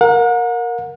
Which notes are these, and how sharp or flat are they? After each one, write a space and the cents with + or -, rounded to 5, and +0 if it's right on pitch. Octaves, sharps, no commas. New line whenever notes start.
A#4 +0 F#5 -40